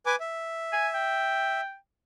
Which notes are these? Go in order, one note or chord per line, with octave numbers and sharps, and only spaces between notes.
B4 G#5 D6
E5
G#5
G5